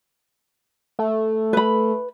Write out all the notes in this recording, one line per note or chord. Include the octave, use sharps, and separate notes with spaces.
A3
B4 B5